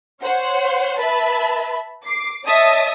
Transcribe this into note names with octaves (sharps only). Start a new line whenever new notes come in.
C5 C#5 F#5
B4 E5 A5 B5
D6 C7
C#5 D#5 E5 A5 D#6